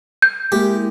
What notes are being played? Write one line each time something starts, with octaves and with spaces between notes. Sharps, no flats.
G6
G#3 A#3 E4 G4